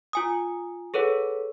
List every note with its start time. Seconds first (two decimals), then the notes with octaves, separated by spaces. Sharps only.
0.13 F4 G#5 D#6
0.94 G#4 A4 B4 C#5 F#5